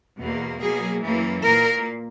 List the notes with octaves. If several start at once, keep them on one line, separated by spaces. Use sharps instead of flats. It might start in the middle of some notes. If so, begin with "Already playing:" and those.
E2 B2 A#3
B2 F#3 A#3 G#4
F#2 E3 A#3
A#2 A#3 A#4